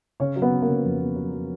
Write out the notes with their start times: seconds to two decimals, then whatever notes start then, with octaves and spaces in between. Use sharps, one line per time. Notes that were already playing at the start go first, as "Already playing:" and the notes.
0.20 C#3 C#4 C#5
0.36 F#3
0.42 B3 B4
0.51 C#3
0.62 A#3 A#4
0.68 C#3
0.84 F2
1.00 B3
1.16 F#3
1.32 F#3